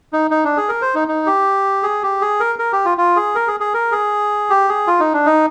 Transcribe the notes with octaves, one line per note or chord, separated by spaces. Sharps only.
D#4
D#4
D4
G#4
A#4
C5
D#4
D#4
G4
G#4
G4
G#4
A#4
A#4
G4
F4
F4
G#4
A#4
G#4
G#4
A#4
G#4
G4
G#4
F4
D#4
D4
D#4